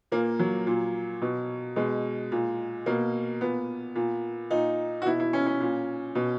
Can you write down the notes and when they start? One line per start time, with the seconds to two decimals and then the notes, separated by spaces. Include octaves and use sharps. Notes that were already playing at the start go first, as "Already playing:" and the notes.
0.12 A#2 A#3
0.39 F#3
0.67 A#2
1.22 B2
1.76 B2 G#3
2.32 A#2
2.86 B2 A#3
3.41 A#2 B3
3.95 A#2
4.51 A#2 D#4
5.02 F#4
5.06 B2 E4
5.20 E4
5.33 C#4
5.46 C#4
5.61 A#2
6.15 B2